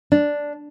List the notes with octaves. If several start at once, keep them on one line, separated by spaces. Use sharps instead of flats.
D4